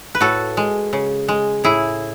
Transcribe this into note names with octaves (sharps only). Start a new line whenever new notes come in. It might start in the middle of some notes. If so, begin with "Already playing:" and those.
B4
A2 F#4 A4
G#3
C#3
G#3
A2 E4 G#4